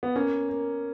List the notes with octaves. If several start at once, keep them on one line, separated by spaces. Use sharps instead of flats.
B3
A#3 C#4
A#3